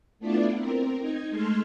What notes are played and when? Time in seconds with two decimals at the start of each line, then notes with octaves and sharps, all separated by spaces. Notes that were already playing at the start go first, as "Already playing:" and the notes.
0.19 A3 B3 D4 E4 F4 D5
0.56 C4 A#4
0.99 D#4 G#6
1.30 G#3 A3 A4 C6 F6 G#6